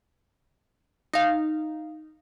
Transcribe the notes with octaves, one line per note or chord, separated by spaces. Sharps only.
D#4 F5